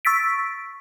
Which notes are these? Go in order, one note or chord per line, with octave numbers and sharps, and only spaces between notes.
C#6 E6 A6 B6 D7